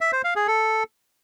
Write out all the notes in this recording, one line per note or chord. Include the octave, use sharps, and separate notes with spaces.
E5
C5
F5
G#4
A4